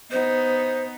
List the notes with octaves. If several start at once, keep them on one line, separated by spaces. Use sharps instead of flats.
B3 D#4 C5